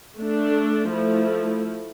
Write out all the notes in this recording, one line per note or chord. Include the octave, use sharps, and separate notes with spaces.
A3 D4 A4
F3 A3 E4